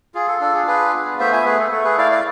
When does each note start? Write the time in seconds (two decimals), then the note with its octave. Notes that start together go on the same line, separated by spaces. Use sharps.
0.15 F4 G#4
0.28 A4
0.41 D4 A4
0.55 G#4
0.67 F4 G#4 B4
0.94 B3
1.19 A3 C5 E5
1.32 E5 G#5
1.45 A3 G#4 B4
1.59 A4
1.72 A3 A4
1.85 G#4 B4
1.98 E4 D5 F5
2.12 D5 F5